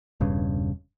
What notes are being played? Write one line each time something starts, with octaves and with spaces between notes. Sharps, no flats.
E1 G2 C#3